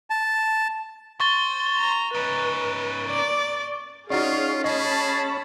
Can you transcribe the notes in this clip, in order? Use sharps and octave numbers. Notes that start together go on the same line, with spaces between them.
A5
C5 C#6 A6 G7
A#5
C#4 D#4 B4
D5
C#4 D#4 F4 F#4 G#4 D5 F5
G#4 D#5 A5 B5